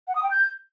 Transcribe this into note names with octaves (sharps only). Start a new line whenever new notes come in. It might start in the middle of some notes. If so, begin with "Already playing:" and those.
F#5
D#6
G5
G6